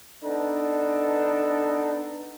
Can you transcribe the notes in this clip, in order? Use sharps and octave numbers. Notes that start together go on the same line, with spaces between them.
B3 D4 D#4 A4